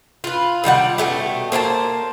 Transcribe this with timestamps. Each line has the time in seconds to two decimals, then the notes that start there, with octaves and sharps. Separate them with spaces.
0.24 F4 B4
0.64 C3 D#3 G3 F#5
0.98 B2 E3 G3 A3
1.52 A#3 C5 G#5 A5